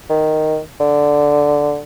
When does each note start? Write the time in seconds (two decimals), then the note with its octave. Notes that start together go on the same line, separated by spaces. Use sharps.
0.10 D#3
0.80 D3